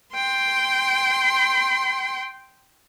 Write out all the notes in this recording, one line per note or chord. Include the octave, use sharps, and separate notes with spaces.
G5 C6